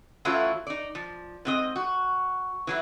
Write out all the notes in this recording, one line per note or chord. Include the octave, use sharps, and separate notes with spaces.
F#2 E3 F#3 A3 E4 F4
D#4 D5
F3
G#2 C4 D#5
F#4
E3 F#3 E4